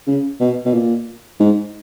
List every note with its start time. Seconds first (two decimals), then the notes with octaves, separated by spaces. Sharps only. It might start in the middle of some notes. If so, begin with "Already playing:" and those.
0.07 C#3
0.40 B2
0.65 B2
0.74 A#2
1.40 G#2